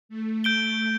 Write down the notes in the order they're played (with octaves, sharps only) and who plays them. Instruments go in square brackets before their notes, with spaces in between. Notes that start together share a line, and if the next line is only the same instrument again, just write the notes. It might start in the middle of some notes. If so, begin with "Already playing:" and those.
[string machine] A3
[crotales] G6 D7 G7